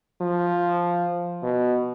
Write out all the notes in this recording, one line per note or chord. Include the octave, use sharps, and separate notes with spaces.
F3
B2